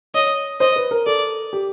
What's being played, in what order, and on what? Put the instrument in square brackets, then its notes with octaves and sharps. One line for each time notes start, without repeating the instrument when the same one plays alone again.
[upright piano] C#5 [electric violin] D#5
[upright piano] C5 [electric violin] D#5
[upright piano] B4
A#4
[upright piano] A4 [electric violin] D5
[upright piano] G4